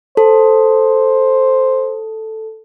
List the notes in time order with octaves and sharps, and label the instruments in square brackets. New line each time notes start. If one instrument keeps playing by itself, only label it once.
[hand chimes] A4 [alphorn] C5